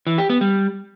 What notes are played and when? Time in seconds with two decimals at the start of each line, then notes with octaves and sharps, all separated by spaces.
0.07 E3
0.18 G4
0.30 B3
0.41 G3